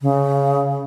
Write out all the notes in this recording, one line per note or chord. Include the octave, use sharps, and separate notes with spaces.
C#3